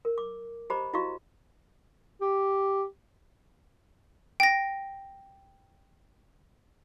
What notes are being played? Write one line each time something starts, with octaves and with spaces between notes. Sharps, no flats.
A#4
D6
G4 C5 D#5 A#5 B5 D6
E4 F#4 D#5 F5 A#5 C#6
G4
G5 A#6